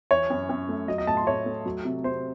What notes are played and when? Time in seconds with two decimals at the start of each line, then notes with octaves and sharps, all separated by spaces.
0.11 E3 C#5
0.30 F#2
0.49 F#2
0.69 A3
0.88 F#3 D#5
0.98 D#5
1.07 A2 A5
1.17 C6
1.27 A2 C#5
1.46 A3
1.66 F#3
1.85 C3
2.04 C3 C5